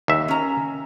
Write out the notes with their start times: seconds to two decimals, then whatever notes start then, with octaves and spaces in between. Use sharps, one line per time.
0.08 D#2 E5
0.28 C#4 A#5